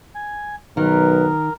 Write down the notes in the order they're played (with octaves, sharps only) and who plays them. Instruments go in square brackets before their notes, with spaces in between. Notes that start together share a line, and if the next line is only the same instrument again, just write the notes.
[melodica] G#5
[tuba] B1 [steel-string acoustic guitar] D#3 [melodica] A#4 [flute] B4